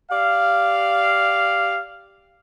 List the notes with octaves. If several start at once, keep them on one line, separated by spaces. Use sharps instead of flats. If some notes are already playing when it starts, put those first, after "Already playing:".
G4 D5 F5